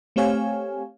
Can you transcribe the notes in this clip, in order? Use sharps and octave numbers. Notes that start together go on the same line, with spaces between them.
A3 C4 G4 C#5 F5 G#5